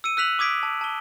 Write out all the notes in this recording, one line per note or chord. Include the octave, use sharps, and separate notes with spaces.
E6 C#7 D#7
E6 F#6 B6 F7 F#7
D6 D#6 G#6 B6 D7
A5
A5 G7